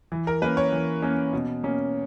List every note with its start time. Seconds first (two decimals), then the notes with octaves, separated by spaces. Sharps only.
0.12 E3
0.27 A#4
0.42 A#3 C#4 B4
0.57 C#5
0.72 E3
1.02 A#3 C#4
1.33 B2
1.63 A#3 C#4